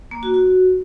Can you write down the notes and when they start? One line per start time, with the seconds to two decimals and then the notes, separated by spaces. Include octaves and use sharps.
0.11 A#3
0.23 F#4
0.34 F#4